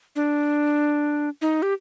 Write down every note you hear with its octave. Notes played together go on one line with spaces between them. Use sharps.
D4
D#4
G4